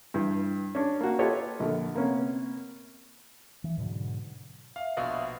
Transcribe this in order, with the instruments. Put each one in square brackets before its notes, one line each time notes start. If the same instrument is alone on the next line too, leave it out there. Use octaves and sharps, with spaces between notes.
[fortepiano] G2 E3
C#4 D4
A#3 F#4
F4 G4 A4 B4 C#5 D#5
A#1 D3
C3 A#3 B3 C#4
[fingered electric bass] E3
G#2 B2 D3 F#3
[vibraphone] E5 [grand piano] F5
[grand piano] A#1 B2 D#5 [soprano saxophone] F5